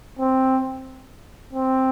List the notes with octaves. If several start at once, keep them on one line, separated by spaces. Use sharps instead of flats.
C4
C4